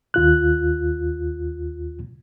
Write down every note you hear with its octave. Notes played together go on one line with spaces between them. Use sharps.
D#2 F4 F#6